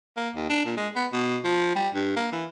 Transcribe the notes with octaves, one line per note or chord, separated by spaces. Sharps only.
A#3
D#2
D4
A#2
G#3
B3
B2
F3
G3
G2
A#3
E3